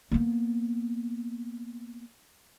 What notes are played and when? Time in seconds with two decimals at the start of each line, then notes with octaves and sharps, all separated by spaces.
0.11 A#3 B3